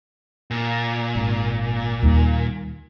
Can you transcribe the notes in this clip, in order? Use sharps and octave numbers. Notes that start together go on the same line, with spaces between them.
A#2
G#1
D#2 G3